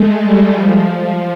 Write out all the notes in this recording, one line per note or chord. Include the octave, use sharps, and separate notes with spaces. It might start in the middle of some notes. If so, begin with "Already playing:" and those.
Already playing: G#3 A3
G3
F3